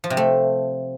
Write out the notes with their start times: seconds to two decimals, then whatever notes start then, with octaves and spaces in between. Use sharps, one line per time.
0.04 F3
0.10 C3
0.17 A3